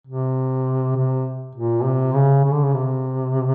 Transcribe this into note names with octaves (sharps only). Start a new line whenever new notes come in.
C3
C3
A#2
C3
C#3
C#3
D3
C#3
C3